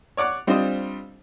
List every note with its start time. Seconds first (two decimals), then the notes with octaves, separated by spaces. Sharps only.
0.17 C#5 D5 F#5 D6
0.47 G3 C4 D4 F4 C5 D#5